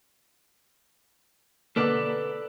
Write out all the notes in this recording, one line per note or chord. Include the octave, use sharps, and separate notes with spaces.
B2 D3 A#3 A4 B4 D5